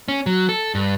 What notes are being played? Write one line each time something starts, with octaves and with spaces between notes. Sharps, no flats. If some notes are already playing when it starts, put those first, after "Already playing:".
C#4
F#3
A4
G2